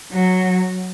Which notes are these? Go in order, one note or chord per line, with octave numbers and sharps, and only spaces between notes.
F#3